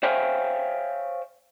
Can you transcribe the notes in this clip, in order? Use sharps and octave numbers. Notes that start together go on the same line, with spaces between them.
C5 C#5 E5 F5 G5 G#5